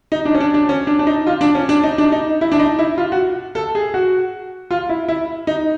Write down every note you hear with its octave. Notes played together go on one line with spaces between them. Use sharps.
D#4
D4
C#4
D4
D4
C#4
D4
D4
D#4
F4
D4
C#4
D4
D#4
D4
D#4
E4
D4
D#4
E4
F4
F#4
A4
G#4
F#4
F4
E4
E4
D#4